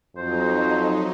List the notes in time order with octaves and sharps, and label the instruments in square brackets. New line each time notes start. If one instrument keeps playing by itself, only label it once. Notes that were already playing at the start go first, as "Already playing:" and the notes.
[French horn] F2 [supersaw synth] F#3 D#4 [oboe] C5